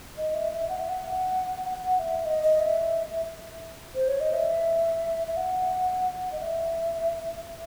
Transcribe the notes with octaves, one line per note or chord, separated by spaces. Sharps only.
D#5
E5
E5
F#5
E5
F#5
F#5
E5
D#5
D#5
E5
C5
C#5
D#5
E5
E5
F#5
D#5
E5